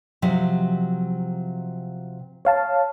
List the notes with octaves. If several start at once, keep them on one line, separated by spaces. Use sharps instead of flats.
C3 F3 F#3
C#5 F5 A5